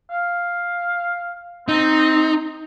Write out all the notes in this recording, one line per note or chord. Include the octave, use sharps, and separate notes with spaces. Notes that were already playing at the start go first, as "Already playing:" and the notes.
F5
C4 D#4